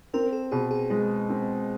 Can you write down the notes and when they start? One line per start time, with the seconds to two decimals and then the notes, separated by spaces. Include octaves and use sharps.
0.14 C4 A#4
0.33 A4
0.51 B2 G#4
0.71 G#4
0.90 G#3
1.29 C4